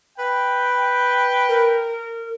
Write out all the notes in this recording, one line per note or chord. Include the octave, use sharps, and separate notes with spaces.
B4 G5
A#4